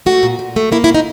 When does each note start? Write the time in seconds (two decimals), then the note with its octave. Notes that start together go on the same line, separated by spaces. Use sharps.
0.06 A3 F#4
0.23 A#2
0.39 A#2
0.56 A3
0.72 A#3 E4
0.84 E4
0.89 B2
0.94 D#4